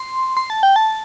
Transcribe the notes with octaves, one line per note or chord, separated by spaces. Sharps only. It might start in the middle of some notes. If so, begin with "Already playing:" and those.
Already playing: C6
C6
A5
G5
A5